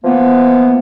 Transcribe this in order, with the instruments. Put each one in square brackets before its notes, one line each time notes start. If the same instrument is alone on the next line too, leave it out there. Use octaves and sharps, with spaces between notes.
[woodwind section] E3 F3 A#3 B3